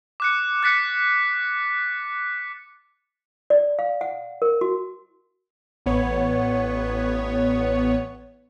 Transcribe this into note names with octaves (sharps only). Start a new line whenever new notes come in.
D6 F#6 C#7
F#6 A6 B6 C#7
D5
F5
F#5
A#4
F#4
A1 B3 C#5